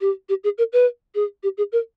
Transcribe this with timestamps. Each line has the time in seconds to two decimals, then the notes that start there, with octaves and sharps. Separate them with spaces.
0.01 G4
0.29 G4
0.44 G#4
0.58 A#4
0.73 B4
1.15 G#4
1.43 G4
1.58 G#4
1.72 A#4